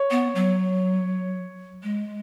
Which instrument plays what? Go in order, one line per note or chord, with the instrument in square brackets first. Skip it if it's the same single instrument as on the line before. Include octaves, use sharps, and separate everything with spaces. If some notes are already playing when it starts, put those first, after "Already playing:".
Already playing: [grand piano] C#5
[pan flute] B3
F#3
G#3